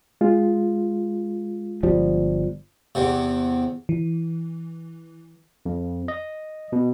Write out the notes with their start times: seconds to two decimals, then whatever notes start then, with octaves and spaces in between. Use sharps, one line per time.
0.21 G#3 F4
1.83 G1 F3 G3
2.95 E2 C3
3.89 E3
5.66 F2
6.08 D#5
6.72 B2